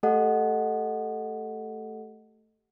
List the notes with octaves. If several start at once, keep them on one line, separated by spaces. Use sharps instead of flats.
A3 G4 A4 D#5 F#5